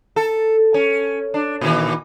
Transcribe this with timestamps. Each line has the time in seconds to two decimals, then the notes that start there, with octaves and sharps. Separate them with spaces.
0.16 A4
0.74 C#4
1.34 D4
1.61 A#2 D#3 E3